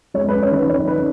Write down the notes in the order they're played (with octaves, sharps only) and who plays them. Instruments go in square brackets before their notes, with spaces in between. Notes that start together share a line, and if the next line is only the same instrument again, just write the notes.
[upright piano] G#3 C#5
B4
C#4
C#5
D#3 B4
D#3 C#5
C#4 B4